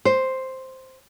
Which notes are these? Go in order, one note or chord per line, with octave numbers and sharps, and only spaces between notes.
C5